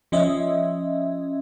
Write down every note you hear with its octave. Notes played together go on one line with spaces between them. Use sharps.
F3 C#4 D#5 E5